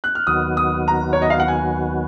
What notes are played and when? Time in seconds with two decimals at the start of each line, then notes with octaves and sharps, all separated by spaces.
0.04 F#6
0.15 F6
0.27 D#2 D#3 F#3 B3 F#4 D#6
0.57 D#6
0.88 A#5
1.13 C#5
1.22 D#5
1.30 F5
1.40 F#5
1.48 G#5